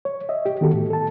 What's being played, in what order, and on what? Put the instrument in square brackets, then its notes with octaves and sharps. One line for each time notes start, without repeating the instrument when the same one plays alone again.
[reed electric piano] C#5
D#5 E5
G4
D#3 B3 F#4 G4 A4
A2
A4 A5